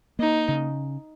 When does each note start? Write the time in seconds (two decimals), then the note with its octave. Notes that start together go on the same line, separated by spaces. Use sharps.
0.19 A#3 D#4
0.48 C#3